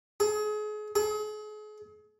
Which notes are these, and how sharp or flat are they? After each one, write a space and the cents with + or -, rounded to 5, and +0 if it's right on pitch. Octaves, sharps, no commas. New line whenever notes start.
G#4 +35
G#4 +40